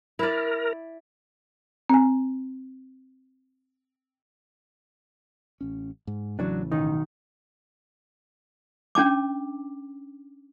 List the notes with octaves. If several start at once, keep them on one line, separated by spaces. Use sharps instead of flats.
E4 A#4 D5
C4 G#5
A1 C#4
G#2
A1 C#3 E3 F#3 D4
B1 D#3 D#4
C#4 D4 A5 D6